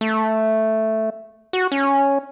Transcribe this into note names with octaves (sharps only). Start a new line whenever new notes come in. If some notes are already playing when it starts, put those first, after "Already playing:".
A3
F#4
C#4